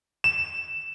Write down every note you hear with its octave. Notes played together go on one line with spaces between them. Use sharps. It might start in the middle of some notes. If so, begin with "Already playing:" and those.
E7